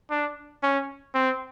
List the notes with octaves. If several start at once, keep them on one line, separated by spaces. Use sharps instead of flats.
D4
C#4
C4